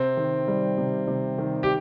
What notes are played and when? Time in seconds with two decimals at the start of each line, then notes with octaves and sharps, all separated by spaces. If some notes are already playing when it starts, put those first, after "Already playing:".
Already playing: C3 C4
0.17 D#3
0.48 G3
0.78 C3
1.08 C3
1.38 D#3
1.63 G4